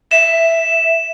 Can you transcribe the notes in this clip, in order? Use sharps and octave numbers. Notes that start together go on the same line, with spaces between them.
E5 E7